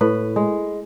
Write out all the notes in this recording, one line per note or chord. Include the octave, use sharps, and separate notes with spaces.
A2 B4
G#3